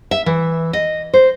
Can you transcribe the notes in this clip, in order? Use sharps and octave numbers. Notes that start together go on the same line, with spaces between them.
E5
E3
D#5
C5